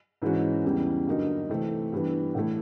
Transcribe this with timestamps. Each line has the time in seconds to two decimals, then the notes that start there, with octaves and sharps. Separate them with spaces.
0.22 G#2 E3 G#3 C#4 F#4
0.64 E2 C#3 E3 G3
1.07 G2 D3 F#3 A#3 D#4
1.49 C3 E3 A3 C4
1.92 G2 E3 G3 B3
2.35 A2 E3 A3